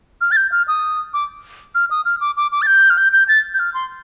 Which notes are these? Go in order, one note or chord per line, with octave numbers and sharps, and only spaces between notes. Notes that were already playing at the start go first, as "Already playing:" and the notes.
F6
A6
G6
F6
D#6
D6
F6
D#6
F6
D6
D6
D6
A6
G6
F6
G6
G6
A6
G6
F6
C6